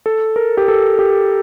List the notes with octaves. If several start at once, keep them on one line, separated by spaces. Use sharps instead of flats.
A4
A#4
G4
A4
G4